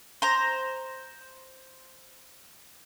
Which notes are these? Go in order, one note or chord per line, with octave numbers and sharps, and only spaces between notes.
C5 A#5